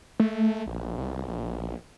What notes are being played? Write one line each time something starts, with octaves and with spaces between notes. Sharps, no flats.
A3
A#1
C2
A#1